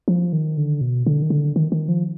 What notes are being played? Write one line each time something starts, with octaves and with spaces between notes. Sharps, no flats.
F3
D#3
D3
B2
D3
D#3
D3
D#3
D#3
F3